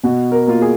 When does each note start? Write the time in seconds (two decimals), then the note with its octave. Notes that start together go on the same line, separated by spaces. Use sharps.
0.03 B2 F#4
0.32 A#4
0.47 A#3 F4
0.61 G#4